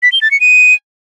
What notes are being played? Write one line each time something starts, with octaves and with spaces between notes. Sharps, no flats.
B6
G7
A6
C#7
D#7